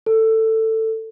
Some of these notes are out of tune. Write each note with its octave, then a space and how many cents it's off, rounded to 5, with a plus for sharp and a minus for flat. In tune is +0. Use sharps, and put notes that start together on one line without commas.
A4 +15